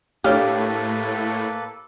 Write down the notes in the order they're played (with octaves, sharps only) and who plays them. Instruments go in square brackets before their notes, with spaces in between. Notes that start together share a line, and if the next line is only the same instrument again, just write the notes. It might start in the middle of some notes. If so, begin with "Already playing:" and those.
[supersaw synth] A2 [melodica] A#3 A4 B4 [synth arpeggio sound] D4 C#5 F5 [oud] G4